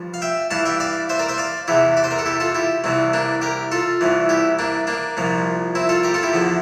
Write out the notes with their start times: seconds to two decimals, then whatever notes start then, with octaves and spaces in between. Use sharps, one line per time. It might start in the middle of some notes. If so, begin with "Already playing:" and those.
Already playing: G2 F3
0.14 F5
0.22 E5 G5
0.51 G2 E3 F5 A5
0.65 E5 G5
0.80 D5 F5
1.09 C5 E5
1.19 A#4 D5
1.29 C5 E5
1.38 D5 F5
1.68 E2 C3 E3 E4 G4
1.97 D5
2.04 C5
2.11 A#4
2.19 A4
2.26 E4 G4
2.40 F4 A4
2.55 E4 G4
2.84 C2 C3 E3 C4
3.13 A#3 D4
3.42 G4 A#4
3.72 F4 A4
4.01 C2 C3 E3
4.29 E4 G4
4.59 A#3 D4
4.87 A#3 D4
5.17 C2 A#2 F3
5.75 C4 E4
5.89 F4 A4
6.03 G4 A#4
6.14 F4 A4
6.23 E4 G4
6.33 E2 D3 F3